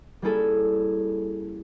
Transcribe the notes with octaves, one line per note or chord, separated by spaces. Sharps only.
G3 A#3 C#4 E4 G#4 A4